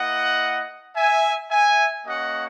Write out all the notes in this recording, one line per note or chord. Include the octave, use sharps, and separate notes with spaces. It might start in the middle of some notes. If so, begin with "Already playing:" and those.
Already playing: A#3 E4 D#5 F#5
E5 G#5
E5 G#5
A#3 C#4 F#4 D#5 F#5